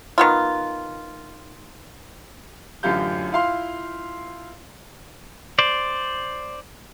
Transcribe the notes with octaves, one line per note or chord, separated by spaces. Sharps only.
D#3 B3 F4
A1 F#2 D3 F4 G4 G6
E4 F4 F5 C6
C5 D5